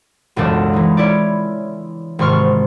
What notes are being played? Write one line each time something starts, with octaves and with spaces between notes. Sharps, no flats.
E1 C#2 F#2 C#3 D4 A4
E3 D#4
C#4 E4 C#5 D5
G#1 G#2 C3 C6 C#6 F6